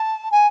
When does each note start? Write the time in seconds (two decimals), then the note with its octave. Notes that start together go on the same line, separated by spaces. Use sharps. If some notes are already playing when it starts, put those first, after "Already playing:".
Already playing: A5
0.31 G#5